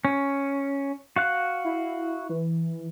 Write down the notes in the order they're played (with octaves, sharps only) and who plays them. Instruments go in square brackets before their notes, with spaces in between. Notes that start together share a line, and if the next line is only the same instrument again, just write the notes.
[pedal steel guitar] C#4
F#4 F5 F#6
[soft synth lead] E4
E3